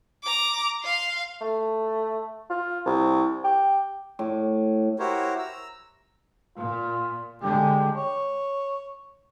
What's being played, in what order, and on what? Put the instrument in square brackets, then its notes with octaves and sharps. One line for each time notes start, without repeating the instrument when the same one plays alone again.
[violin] A#5 D6
F5 C6
[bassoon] A3
F4
C2
G4
[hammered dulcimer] A2 D6
[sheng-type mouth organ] E4 F#4 G4 A#4 C5 C#5
A#5 E6
[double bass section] A#2 [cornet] F4
[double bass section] D3 G#3 [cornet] G4
[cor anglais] C#5